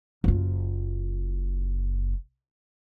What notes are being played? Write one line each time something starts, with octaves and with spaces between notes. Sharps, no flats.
F#1 F4